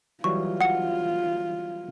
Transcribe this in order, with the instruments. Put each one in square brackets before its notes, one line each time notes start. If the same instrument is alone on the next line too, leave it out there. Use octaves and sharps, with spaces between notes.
[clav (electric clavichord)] E3 F#3 G3 [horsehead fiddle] F4 [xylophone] C#6
[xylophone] F#5 C#7